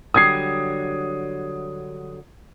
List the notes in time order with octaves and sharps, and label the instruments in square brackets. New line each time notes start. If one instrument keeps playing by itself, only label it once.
[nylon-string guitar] D3 F#3 G3 [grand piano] D#6 G#6 C7